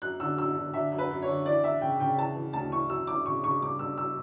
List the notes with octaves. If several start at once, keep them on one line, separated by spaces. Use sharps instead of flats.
F#2 F#6
D3 E6
F#2 E6
D3
D3 E5
F#2
B4
F#2
D3 C#5
E3 D5
E3 E5
C#3 G5
C#3 G5
E3 A5
E3
D2 A5
E3 C#6
F#2 E6
E3 D6
C#3 C#6
C#3 C#6
G2 D6
G2 E6
E6